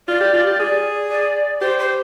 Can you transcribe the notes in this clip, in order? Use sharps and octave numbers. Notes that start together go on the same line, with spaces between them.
F4 D5
G4
F4
G4
G#4
D5
G4 C5
C5